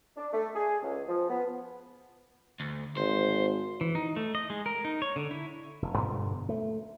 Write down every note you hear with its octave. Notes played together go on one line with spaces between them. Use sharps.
D4
A3
G#4
C#2
F3
B3
D2
G#1 C5
E3
D#4
A3
D#5
G#3
A#4
D#4
C#5
D3
E4
F1
G2 B2 D3 F3
A3